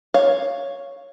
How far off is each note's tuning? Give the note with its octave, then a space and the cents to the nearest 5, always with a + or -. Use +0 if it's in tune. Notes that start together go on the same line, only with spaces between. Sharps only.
C#5 +0 F5 +5